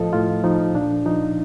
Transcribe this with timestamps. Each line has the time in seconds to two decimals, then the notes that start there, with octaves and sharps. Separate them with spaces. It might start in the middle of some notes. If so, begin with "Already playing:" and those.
Already playing: A2 F3 A4 D#5
0.13 A2 F4
0.44 F3 D#4
0.74 A#2 D4
1.06 F3 D#4